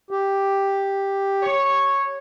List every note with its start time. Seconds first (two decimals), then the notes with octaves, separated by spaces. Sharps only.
0.11 G4
1.42 C#5